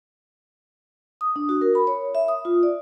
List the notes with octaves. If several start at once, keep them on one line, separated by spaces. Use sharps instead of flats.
D#6
D4
F#4
A#4
B5
C#5
E5
D#6
F4
D5